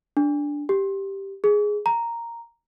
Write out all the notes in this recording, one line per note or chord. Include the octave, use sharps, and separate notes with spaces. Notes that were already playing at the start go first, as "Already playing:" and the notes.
D4
G4
G#4
A#5